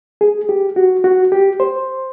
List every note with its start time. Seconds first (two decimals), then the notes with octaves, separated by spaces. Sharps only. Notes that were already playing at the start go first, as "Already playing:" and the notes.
0.21 G#4
0.49 G4
0.76 F#4
1.04 F#4
1.32 G4
1.60 C5